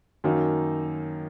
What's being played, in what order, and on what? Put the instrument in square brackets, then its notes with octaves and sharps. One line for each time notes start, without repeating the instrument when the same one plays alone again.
[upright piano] F#2 D#3 F#3 A#3 D#4